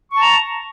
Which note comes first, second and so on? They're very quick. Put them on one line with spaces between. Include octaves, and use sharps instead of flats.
C#6 A5 A#5